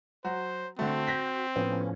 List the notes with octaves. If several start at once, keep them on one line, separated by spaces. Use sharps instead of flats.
F#3 F#4 C5
D3 A3 C4 F#4
G6 A#6 B6
A2 F3 B3 C#4